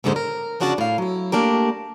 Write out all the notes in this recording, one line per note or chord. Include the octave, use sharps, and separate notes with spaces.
D#2 G#2 D3 G#3 C#4 C5
A#4
F2 C#3 D4 F#4 G#4 A5
A2 F5
F#3 E4
A3 A#3 D4 G4 A#4